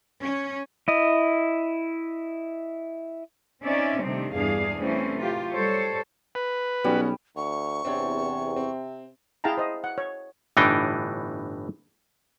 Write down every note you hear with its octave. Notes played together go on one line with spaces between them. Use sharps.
C#4
E4 D#5
C4 C#4 D#4 D5 E5
C3 D#3 G3 A3 C4 D4
E2 G2 E3 D4 G#4 F5
C3 E3 G3 A3 C4 C#4
F#3 F4 G4
G3 A4 C5 C#5
B4
B1 G3 B3 C#4 F#4
D2 C#6
E2 C3 C4 D4 C#5
C4
E4 G#4 F5 G5 A5 A#5
C5 D#5
F#5
C#5
G1 A2 E3 D4 D#4 G5